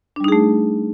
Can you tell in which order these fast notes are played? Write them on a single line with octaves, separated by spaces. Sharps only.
D4 G3 D#4 G#4 A3